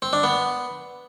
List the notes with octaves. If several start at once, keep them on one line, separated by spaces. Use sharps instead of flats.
C4
D4
B3